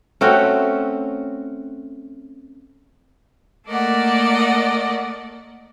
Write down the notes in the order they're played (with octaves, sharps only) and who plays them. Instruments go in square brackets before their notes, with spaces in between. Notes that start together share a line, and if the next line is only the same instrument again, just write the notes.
[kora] A3 C4 C#4 F#4
[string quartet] A3 A#3 A#4 D5 D#5 F#5